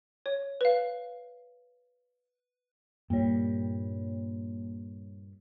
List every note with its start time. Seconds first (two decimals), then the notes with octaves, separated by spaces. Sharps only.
0.26 C#5
0.61 B4 F5
3.10 G2 A#2 G3 A#3 C#5